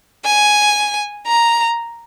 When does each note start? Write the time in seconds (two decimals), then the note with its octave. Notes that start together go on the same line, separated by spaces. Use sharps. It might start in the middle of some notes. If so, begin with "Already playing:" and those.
0.25 G#5
1.27 A#5